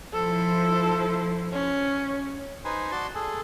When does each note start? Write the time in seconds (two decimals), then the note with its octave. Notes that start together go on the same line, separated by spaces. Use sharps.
0.13 F3 E4 A4 C5
1.52 C#4
2.65 D#4 B4 C5 G#5
2.92 F#4 D5 A5 C6
3.15 G#4 A4